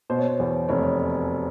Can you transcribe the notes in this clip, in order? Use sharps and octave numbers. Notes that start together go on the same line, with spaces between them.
B2 C5
C#5
C5
E2 C#5
F1 C#5